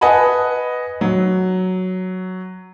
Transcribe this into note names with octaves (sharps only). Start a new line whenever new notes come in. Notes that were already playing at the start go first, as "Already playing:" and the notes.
B4 D#5 F#5 G#5 A5 B5
F#3